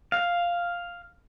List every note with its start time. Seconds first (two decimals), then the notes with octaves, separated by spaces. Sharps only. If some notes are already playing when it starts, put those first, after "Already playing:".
0.12 F5